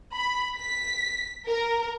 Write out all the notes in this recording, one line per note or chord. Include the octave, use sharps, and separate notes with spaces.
B5
B6
A#4